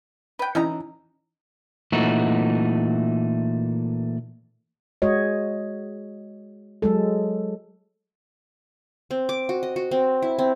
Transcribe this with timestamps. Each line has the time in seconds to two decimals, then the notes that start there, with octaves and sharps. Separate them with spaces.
0.39 B4 G5
0.55 E3 C#4 D#4 A#5
1.92 A#2 E3 A3 D#4 F#4
5.02 G#3 F#4 C#5 D#5
6.82 F#3 G#3 A4
9.11 C4
9.29 D6
9.49 F#4
9.63 D#5
9.76 F#4
9.91 C4
10.22 E4
10.39 C4